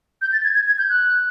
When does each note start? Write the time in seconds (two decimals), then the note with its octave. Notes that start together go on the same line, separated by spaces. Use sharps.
0.21 G6
0.32 A6
0.44 G#6
0.55 G#6
0.66 G#6
0.78 G6
0.89 F#6